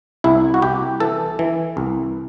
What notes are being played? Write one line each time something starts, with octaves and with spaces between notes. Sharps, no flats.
C2 E4
F#4
C2 G4
E3 A4
E3
C2